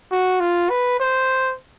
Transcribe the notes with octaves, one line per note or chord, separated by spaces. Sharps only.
F#4
F4
B4
C5